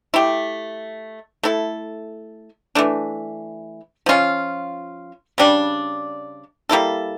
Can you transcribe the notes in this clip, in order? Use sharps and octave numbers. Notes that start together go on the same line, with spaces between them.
A3 E4 G4
A3 E4 A4
E3 A3 D4
F3 C#4 F4
C#3 G3 D4
G3 A#3 E4 A4